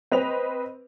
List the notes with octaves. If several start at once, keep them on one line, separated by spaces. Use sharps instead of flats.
C4 B4 D#5 F7